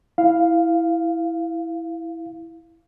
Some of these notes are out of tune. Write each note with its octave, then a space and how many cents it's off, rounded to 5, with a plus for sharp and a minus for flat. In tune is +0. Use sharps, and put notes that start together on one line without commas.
E4 +0 F5 +0